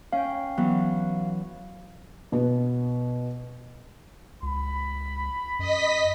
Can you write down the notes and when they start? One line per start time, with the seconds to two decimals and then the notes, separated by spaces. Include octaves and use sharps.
0.13 C#4 F5 G5
0.58 E3 F#3 B3
2.32 B2 B3
4.43 C#2 B5
5.59 F#2 D#5 B6